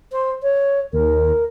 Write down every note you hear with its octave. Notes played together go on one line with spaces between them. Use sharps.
C5
C#5
D#2 A#4